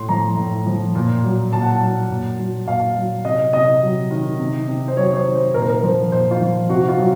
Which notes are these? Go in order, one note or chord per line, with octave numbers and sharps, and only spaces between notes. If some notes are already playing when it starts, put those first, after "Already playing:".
Already playing: A2 C6
F3 A#5
A2
F3
A#2
F#3
A#2 A5
F#5
A5
F#3
A#2
F#3
A#2 F5
F#3
C3 D#5
C3 D#5
F#3
D#3
C3
C3
C5
F#3 C#5
C#5
C5
D#3
C5
A#2 A#4
C5
A#4
F3 C5
A#2 C5
F4
F3
C3 F#4
F4
F#3